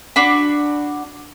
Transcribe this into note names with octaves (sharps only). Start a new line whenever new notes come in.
D4 F#4 B5